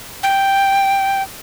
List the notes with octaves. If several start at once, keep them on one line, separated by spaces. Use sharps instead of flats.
G5